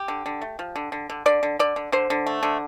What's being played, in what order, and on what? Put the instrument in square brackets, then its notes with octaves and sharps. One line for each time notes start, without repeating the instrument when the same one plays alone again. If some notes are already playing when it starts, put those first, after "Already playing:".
Already playing: [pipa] G4
D3
D3
A3
F3
D3
D3
D3
D3 D5
D3
D3 D5
D3
D3 C5
D3
A3
D3